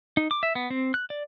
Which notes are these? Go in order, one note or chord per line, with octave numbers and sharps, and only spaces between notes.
D#4
D6
E5
B3
C4
F#6
D5